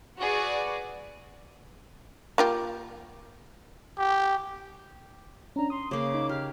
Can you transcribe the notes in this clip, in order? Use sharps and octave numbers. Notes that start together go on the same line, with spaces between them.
F#4 G#4 B4 D5
A#3 F4 G4
G4
C#4 D4 A#5
C6 D#6
C#3 A#3 D6
D#4
G4 F6